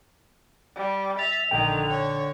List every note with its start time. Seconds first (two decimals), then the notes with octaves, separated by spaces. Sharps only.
0.75 G3
1.19 E5 A6 F7
1.51 A#1 D3 D#3 G5
1.90 C#5